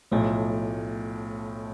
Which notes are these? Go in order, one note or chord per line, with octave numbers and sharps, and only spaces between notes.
B1 A2 F3 A3